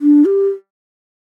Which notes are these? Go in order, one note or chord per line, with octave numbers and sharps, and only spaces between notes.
D4
G4